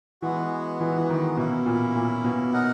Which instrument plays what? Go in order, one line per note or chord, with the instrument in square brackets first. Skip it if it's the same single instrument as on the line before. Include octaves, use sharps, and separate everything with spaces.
[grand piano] E3 [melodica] G#3 B3 F#4
[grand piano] E3
E3
D#3
[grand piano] B2 [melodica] A#3 C#4 E4
[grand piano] A#2
A#2
B2
[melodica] D#4 A#4 D#5 F#5